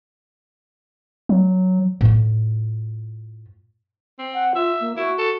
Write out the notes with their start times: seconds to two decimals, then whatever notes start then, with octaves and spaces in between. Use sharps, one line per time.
1.29 F#3
2.01 A2 F4
4.19 C4
4.34 F#5
4.55 F4 E5
4.81 A#3
4.97 E4 F#4
5.18 A4